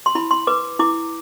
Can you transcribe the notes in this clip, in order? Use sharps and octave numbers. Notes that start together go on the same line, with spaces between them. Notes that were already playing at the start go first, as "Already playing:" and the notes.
C6
E4 B5
C6
B4 D6
E4 D6